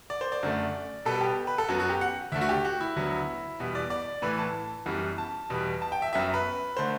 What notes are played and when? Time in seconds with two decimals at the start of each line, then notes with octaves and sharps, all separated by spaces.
0.10 D5
0.21 C5
0.32 D5
0.43 F#2 D3 A3
1.05 B2 G3 B3 A4
1.21 G4
1.47 B4
1.58 A4
1.69 F#2 F#3 B3 F#4
1.80 F#4
1.90 G4
2.01 F#5
2.32 D2 D3 A3 E5
2.41 F#4
2.49 G4
2.65 F#4
2.81 E4
2.96 D2 D3 F#3 B3
3.60 E2 B2 G3 B3
3.75 D5
3.90 D5
4.22 A2 E3 A3 B4
4.39 A5
4.86 F#2 E3 G3 B3
5.18 A5
5.50 E2 B2 G3 B3
5.82 A5
5.92 G5
6.02 E5
6.13 F#2 F#3 B3 E5
6.34 B4
6.77 D3 A3 C5